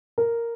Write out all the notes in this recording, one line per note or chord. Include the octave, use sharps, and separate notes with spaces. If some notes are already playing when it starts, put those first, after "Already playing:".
A#4